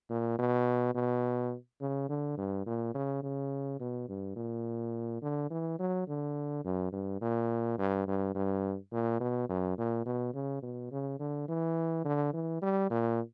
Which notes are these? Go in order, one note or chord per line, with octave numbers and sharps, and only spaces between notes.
A#2
B2
B2
C#3
D3
G2
A#2
C#3
C#3
B2
G2
A#2
D3
E3
F#3
D3
F#2
G2
A#2
G2
G2
G2
A#2
B2
F#2
A#2
B2
C#3
B2
C#3
D3
E3
D3
E3
G3
A#2